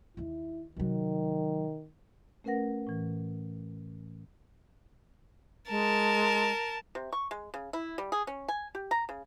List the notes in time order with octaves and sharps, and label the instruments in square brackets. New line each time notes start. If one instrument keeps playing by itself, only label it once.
[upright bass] D#2 D#3 [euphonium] E4
[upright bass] C3 F#3 [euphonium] D#3
[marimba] A3 C#4 A#4 B4 F#5 A#6
A2 E3
[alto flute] G#3 [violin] A#4 A5
[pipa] C3
C#6
G#3
C#3
E4
G3
G#4
C#4
G#5
G4
A#5
C#3